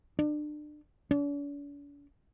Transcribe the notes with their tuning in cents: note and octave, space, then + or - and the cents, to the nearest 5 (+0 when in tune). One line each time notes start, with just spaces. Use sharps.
D4 +30
D4 -45